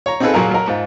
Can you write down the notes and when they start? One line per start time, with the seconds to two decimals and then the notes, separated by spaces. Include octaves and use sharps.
0.06 C#5 A#5
0.20 C4 D#4 F4 G#4 A4 B4
0.34 A#2 F#3 A#3 G#4 A#4
0.51 F#3 A#4
0.68 G#2 F4